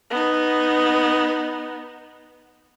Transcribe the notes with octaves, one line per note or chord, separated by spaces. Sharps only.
B3 D#4